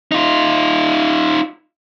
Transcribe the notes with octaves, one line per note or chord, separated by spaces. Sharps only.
D#4 F4